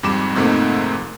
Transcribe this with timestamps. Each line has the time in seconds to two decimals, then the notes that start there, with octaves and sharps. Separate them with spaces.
0.03 F2 G#2 G3 D6 E7
0.35 F2 G#2 C3 A3 A#3 D#4